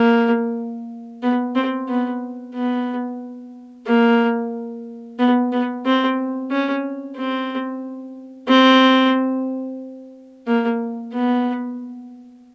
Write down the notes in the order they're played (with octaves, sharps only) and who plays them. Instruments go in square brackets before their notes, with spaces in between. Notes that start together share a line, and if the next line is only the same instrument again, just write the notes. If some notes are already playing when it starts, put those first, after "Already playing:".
Already playing: [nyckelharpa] A#3
B3
C4
B3
B3
A#3
B3
B3
C4
C#4
C4
C4
A#3
B3